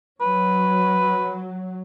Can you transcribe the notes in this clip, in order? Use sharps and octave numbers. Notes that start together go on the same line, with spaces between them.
F#3 B4